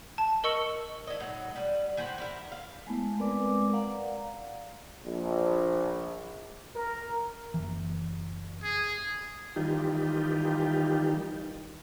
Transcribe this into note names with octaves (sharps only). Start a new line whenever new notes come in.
A5
A#4 D#5 C#6 E6 C#7 F#7
E4 D#5
A2 F#3 D#4 F#4
G3 B4
E3 G4 C5 F#5
E4 A#4
F5
G#3 A3 B3 E4
G#3 C4 A#4 B4 D5 D6
D5 F5 F#5 A#5
A#1
A#4
F#1 C#2 E3
G#4
D#3 E3 G3 D#4 F4 G4